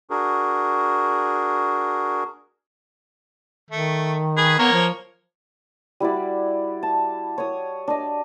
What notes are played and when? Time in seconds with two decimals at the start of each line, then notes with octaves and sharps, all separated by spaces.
0.10 D4 F#4 G#4 A#4
3.70 D#3 A3
4.37 G#4 B4
4.59 A#3 B3 A#4 C#5
4.72 F3
6.00 G3 E4 F#4 D5
6.83 A5
7.38 C#5 D#6
7.88 D4 D#5